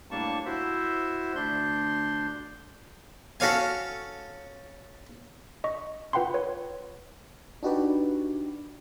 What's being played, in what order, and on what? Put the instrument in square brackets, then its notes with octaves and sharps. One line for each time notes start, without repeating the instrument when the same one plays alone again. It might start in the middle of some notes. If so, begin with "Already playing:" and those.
[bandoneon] A2 G3 A#3 D4 A5 C#6
E4 F#4 C5 E5
D2 D4 C6 G6
[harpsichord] C#4 F#4 A4 C#5 F5 G#5
[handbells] D#5 C#6
F4 B4 F#5 G5 B5 C6
B4 C#5
[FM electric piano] D4 D#4 F#4 G4 B4 D5